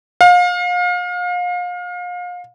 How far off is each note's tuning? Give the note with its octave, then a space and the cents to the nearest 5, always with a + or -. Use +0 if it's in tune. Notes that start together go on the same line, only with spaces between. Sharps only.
F5 +35